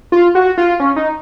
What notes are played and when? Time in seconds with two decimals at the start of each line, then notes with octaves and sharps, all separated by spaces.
0.12 F4
0.35 F#4
0.58 F4
0.80 C#4
0.96 D#4